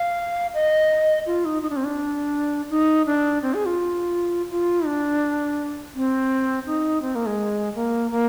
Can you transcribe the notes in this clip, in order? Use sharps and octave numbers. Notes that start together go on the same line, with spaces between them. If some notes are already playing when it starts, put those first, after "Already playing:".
Already playing: F5
D#5
F4
D#4
D#4
D4
C4
D4
D#4
D4
C4
G#4
F4
F4
D4
C4
D#4
C4
A#3
G#3
A#3
A#3